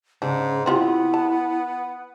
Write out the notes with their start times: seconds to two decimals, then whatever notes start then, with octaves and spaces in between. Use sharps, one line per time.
0.22 G#2 C#3 D4
0.66 B3 C4 E4 F4 G4
1.14 A5